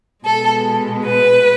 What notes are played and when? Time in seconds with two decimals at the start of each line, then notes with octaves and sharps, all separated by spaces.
0.25 B2 G#3 A4
1.05 B4